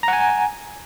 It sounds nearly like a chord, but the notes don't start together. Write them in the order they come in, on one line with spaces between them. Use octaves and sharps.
A#5 F#5 G#5